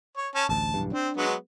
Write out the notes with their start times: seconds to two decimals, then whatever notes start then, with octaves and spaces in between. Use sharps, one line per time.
0.17 C#5
0.35 C#4 A5
0.49 A1 D2 A5
0.74 B1 E2 G2
0.93 C4 D4
1.17 F#3 G#3 B3